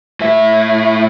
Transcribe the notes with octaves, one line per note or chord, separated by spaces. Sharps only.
A2 E5